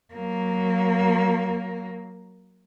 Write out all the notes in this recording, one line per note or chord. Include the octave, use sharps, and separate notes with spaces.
F#3 A#3